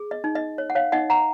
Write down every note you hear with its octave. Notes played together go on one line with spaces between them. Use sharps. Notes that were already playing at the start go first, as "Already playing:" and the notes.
Already playing: G#4
D#5
D#4
D#5
C#5
F#5
C#5 F5
D#4 D#5 F#5
F#5 A#5